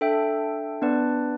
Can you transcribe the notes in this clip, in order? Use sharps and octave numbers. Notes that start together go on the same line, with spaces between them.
D4 A4 E5 G5
B3 D4 B4 D5